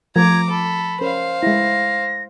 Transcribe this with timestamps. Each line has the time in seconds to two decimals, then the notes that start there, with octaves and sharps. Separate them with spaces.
0.16 F3 A3 A#5 D6 G#6
0.50 A4 B5
1.01 C#4 A#4 C5 F5
1.43 G#3 E4 A#6